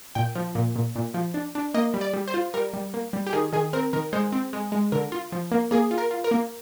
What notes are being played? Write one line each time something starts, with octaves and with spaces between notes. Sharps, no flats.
A#2 G5
F3
A#2
A#2
A#2
F3
D4
D4
A#3 D#5
G3
D5
G3
C5
F4
G3 A#4
G3
A#3
G3
G4
D#3 G#4
D#3 G#4
C4 A#4
D#3 A#4
G#3 C5
C4
G#3
G#3
D3 A#4
F4
F3
A#3
A#3 G#4
F4
A#4
F4
A#4
A#3